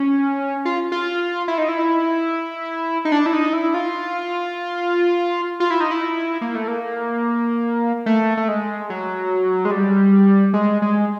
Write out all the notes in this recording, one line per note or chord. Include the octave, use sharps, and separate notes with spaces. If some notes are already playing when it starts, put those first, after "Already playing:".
Already playing: C#4
F4
F4
E4
D#4
E4
D#4
D4
E4
D#4
E4
F4
F4
E4
D#4
E4
A#3
A3
A#3
A3
A3
G#3
F#3
G#3
G3
G#3
G#3